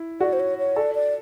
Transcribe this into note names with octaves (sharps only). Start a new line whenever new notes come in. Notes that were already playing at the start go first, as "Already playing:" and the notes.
Already playing: E4
F#4 D5
C5
C#5
C#5
A4 D5
D5